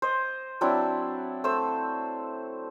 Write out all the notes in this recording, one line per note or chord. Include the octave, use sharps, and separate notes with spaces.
C5 D#5
F#3 C4 D4 E4
A3 C5 E6